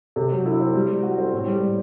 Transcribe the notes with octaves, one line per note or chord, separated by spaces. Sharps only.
C3
F#3
E4
C4
G3
G3
F#4
C4
A2
G3
A2